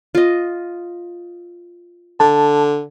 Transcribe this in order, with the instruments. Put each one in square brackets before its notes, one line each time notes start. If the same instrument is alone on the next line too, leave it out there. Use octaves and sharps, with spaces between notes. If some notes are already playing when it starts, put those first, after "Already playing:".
[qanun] F4 D#5
[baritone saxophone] D3 [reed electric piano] A5